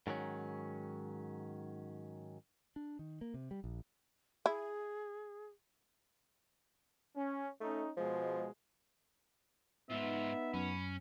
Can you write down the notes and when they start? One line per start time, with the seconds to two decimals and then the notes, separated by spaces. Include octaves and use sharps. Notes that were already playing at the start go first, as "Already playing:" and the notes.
0.07 G#2 D#3 F#3 C#4
2.76 D4
2.99 D#3
3.21 A#3
3.34 C3
3.51 G3
3.64 A#1
4.46 E4 G#4
7.16 C#4
7.61 A3 C#4 D#4
7.97 B2 F3 G#3
9.90 G#2 B3 D#4 F4 E5
10.54 F#2 C#4 B5